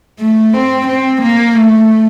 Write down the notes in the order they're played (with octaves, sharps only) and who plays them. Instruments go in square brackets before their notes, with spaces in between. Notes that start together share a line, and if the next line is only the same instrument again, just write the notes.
[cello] A3
C4
C4
A#3
A3